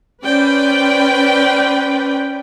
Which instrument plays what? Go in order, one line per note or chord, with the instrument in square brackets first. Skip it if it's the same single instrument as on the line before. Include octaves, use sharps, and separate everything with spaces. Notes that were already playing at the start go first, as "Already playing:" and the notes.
[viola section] C#4 B4 C5 D5 G5